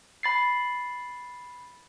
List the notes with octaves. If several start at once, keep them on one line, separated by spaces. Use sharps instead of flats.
B5 A6 C7